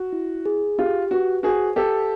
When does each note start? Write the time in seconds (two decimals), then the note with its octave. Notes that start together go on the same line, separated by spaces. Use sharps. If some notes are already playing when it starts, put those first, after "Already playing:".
Already playing: F#4
0.13 E4
0.46 G#4
0.78 F4 G4
1.11 F#4 B4
1.43 F#4 G#4 C5
1.76 G4 A4 F5